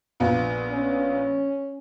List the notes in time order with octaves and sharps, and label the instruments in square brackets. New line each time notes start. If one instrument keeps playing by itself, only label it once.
[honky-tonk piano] A#1 B3 F4
[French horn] C#4